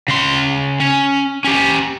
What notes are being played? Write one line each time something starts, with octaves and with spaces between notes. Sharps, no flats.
C#3 C6
C#4
C#4 G4